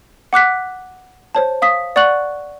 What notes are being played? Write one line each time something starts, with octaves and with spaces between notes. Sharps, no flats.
F#5 D6 F#6 B6
C5 C#5 A5
F5 D#6 B6
D5 F#5 C#6 F#6 F#7